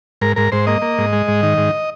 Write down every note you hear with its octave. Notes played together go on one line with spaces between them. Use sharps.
G#2 A#4
G#2 A#4
G#2 C5
A#3 D#5
A#3
G#2
G#3
G#2
D#3
G#2